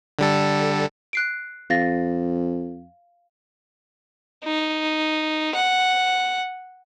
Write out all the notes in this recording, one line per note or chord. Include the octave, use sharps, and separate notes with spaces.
D3 G3 A4
F#6 C7 D7
F2 F5 A6 A#6
D#4
F#5